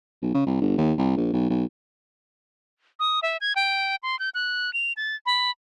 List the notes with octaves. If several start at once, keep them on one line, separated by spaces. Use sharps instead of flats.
B1
C#3
C2
G1
D#2
C2
A#1
B1
B1
D#6
E5
G#6
G5
C6
G6
F#6
F7
A6
B5